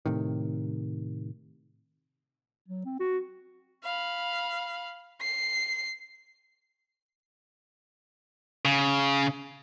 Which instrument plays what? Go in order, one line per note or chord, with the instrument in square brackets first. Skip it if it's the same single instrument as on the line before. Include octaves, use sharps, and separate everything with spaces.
[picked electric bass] A2 C3 D#3
[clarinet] F#3
C4
F#4
[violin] F5 B5
C7
[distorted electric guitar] C#3